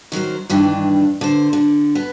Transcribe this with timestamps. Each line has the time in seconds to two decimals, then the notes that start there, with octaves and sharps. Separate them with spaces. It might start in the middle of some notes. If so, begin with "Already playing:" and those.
0.12 D#3 F#3 A#4 C5
0.50 G2 D#3 E3 D4
1.21 D3 C5
1.53 D3
1.95 B3